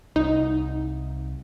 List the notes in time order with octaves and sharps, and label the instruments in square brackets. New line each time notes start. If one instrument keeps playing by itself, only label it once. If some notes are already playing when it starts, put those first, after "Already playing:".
[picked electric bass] C2 [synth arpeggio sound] D#4